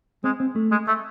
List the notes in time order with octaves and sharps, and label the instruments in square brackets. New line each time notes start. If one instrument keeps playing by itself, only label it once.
[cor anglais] G#3 [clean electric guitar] C4
[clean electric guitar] C4
A3
[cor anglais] G#3
A3